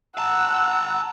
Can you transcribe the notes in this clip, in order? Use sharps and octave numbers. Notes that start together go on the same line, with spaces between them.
F#5 A5 A#5 E6